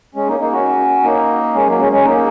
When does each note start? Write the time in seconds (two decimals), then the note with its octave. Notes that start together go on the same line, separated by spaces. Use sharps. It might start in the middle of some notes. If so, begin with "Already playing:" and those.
0.15 G#3 C#4
0.28 A#3 D#4
0.40 A#3 D#4
0.52 C#4 F#4
1.03 A#3 D#4
1.54 G#3 C#4
1.67 F#3 A#3
1.80 G#3 C#4
1.92 G#3 C#4
2.05 A#3 D#4